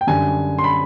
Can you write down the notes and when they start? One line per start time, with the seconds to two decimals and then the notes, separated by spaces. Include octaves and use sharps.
0.01 G5
0.07 F#2 D3 G3 G#5
0.58 C6
0.64 B5